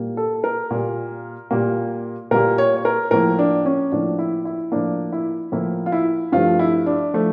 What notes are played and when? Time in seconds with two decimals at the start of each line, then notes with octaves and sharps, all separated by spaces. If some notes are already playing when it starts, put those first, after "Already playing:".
Already playing: A#2 G3 A#3
0.17 A4
0.44 A#4
0.71 A#2 G3 A#3
1.51 A#2 G3 A#3
2.31 A#2 G3 A#3 A#4
2.58 C#5
2.77 C#5
2.85 A#4
3.11 A2 F3 A#3 A#4
3.39 D4
3.66 C#4
3.92 A2 F3 A#3 D4
4.19 E4
4.45 E4
4.72 A2 F3 A#3 D4
5.12 E4
5.52 A2 F3 A#3 E4
5.86 F4
5.92 E4
6.32 G2 F3 A3 F4
6.59 E4
6.86 D4
7.14 F3 A3